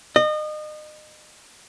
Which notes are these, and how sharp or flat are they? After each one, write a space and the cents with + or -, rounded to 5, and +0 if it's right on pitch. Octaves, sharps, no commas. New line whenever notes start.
D#5 -30